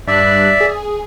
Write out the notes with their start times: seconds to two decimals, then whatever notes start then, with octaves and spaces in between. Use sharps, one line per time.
0.07 G2 D5 E5 F#6
0.61 G#4